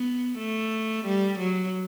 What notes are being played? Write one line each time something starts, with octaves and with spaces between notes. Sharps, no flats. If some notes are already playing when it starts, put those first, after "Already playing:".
Already playing: B3
A3
G3
F#3